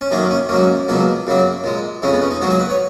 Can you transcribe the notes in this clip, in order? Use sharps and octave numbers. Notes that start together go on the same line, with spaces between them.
C#4
F#2 D#3 A#3 D#4
C#4
G#2 F#3 A#3 C#4
C#2 B2 F#3 A#3
F#2 C#3 F#3 A#3
A#2 G#3
F2 C#3 G#3 C#4
B3
C#4
D#4
G#2 F#3 A#3 F#4
G#4
B4
C#5